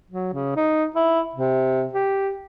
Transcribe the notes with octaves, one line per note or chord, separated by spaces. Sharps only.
F#3
C#3
D#4
E4
C3
G4